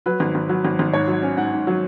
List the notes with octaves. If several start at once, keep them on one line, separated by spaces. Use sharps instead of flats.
F#3 B4
G#1
G#1
F#3
G#1
G#1
G#2 C#5
F#3
C#4
G#2 F#5
G#2
F#3